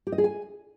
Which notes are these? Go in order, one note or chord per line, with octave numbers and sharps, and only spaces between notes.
G4
D#5
G#4
G#5